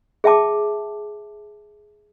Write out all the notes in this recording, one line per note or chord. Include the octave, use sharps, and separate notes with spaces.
G#4 E5 G5 A5 D6